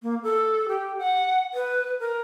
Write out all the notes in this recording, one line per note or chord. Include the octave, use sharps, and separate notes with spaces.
A#3
A4
G4
F#5
B4
A#4